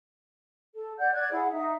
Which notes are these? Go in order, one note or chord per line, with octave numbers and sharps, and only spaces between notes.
A4
D5 F#5 G6
D5 F#6 G#6
E4 G#4 F#5
D#4 E5